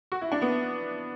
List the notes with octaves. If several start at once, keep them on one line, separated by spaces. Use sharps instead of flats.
F#4
E4
D4
B3